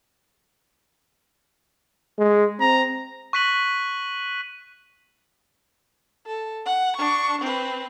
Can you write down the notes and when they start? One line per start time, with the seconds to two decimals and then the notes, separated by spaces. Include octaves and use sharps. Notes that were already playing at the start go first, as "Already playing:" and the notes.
2.19 G#3
2.60 C4 A#5
3.33 C#6 F#6 B6 D#7 F#7
6.26 A4
6.66 F#5
6.97 D4 C#6
7.41 C4 B4